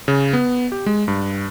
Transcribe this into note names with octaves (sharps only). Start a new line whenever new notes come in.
C#3
B3
G4
G#3
G2